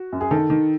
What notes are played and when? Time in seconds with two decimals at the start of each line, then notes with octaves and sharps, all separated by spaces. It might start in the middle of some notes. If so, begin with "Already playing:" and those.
Already playing: F#4
0.12 F#2
0.21 G#4
0.31 D#3 A4
0.50 D#3